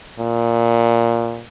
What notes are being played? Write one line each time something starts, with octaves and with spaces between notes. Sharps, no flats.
A#2